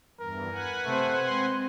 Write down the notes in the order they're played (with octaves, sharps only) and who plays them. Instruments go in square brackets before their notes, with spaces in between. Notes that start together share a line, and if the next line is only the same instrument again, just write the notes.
[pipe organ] E2 G2 E3 [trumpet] A#4
[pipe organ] B4 F#5 G#5
[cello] C3 C5 [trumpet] A3
[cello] G#3 C4 [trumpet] C6